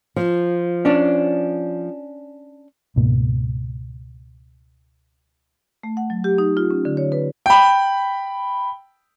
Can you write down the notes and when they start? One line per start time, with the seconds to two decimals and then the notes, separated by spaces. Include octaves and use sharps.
0.16 F3
0.85 C#4 D4
2.96 C#2 G#2 B2 A#3
5.83 A3
5.97 F#5
6.10 F#3
6.24 G4
6.38 D#4
6.57 F4
6.71 C#4
6.85 D3
6.97 C#5
7.12 B4
7.46 G5 B5